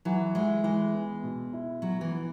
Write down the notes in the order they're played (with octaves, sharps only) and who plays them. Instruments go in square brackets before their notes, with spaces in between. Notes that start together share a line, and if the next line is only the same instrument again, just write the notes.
[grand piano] E3 [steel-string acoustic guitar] F#3
[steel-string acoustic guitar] G#3 [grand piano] E4
[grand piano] E3 [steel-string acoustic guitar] G#3
[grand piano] B3
B2
E4
[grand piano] B2 [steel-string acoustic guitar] F#3
[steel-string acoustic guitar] E3
[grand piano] B3